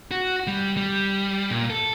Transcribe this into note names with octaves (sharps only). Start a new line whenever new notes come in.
F#4
G3
G3
A#2
A4